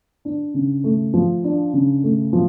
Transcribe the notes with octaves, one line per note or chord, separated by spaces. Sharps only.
D4
C#3
A3
F3
D4
C#3
A3
F3